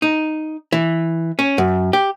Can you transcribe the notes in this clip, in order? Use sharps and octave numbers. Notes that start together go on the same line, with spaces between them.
D#4
E3
C#4
F#2
G4